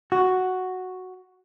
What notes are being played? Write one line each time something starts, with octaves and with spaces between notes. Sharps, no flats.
F#4